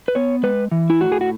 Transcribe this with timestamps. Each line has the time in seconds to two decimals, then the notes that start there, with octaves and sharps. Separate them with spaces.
0.08 B4
0.15 B3 C#5
0.43 G#3 B4
0.72 E3
0.90 E4
1.00 A2 F#4
1.12 G#4
1.21 F#4